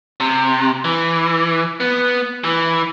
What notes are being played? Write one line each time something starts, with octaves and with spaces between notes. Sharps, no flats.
C3
E3
B3
E3